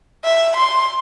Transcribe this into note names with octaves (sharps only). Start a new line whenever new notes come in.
E5
C6